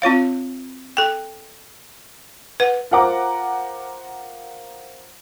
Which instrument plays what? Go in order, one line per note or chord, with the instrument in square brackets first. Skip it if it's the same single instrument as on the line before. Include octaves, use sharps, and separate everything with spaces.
[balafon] C4 F4 C#5 F5
A4 G5
B4 F#5
[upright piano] F4 A#4 C5 F#5 A#5 D6